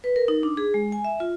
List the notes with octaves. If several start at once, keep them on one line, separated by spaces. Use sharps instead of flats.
B4
A#4
D#4
D4
G#4
G#3
G#5
E5
F4